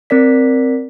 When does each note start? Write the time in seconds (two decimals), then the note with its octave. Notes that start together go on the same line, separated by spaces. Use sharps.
0.10 C4 A#4 D5 B6